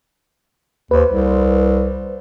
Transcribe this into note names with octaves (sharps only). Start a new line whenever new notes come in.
D#2 B4 C5
C2